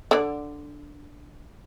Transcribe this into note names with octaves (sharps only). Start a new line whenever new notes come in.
D3 D5